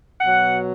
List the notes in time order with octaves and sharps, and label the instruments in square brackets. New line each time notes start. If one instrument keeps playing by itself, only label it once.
[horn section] B2 F#3 F#5